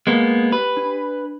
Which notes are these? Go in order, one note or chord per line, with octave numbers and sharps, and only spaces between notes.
G#3 A#3 B3 D#5
G4 B4
D4